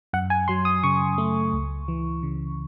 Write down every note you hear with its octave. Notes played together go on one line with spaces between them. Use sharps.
F#2 F#5
G#5
F#3 C6
D#6
C#3 C#6
A3
C#2
E3
C#3